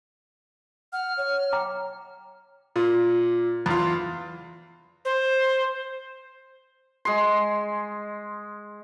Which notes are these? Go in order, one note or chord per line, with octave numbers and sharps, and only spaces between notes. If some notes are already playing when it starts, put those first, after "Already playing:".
F#5 F6
C#5
G5 A#5 D6
A#2
E2 F4
C5
G#3 C6